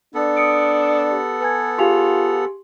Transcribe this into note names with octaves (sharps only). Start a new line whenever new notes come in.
B3 D4 A4
D#6 C#7 D7
G4
B4 G#5 G#6
F4 G4 G#4 F5 G#5 C6 F7